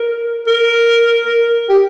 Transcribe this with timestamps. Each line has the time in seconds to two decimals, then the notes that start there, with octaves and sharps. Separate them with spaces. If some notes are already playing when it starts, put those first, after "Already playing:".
Already playing: A#4
0.47 A#4
1.25 A#4
1.69 G4